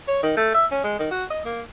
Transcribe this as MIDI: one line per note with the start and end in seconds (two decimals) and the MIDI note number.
0.08 0.19 73
0.23 0.33 51
0.37 0.54 57
0.54 0.66 76
0.71 0.82 61
0.84 0.98 56
0.99 1.08 51
1.11 1.24 66
1.30 1.41 75
1.45 1.61 58